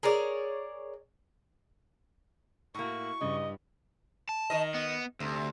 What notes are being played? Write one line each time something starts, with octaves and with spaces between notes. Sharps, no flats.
G#4 A#4 C#5 D5
A2 A#3 E4 F#4 C#6
G2 C#3 D#5
A5
D#3 D#5
B3
D2 C3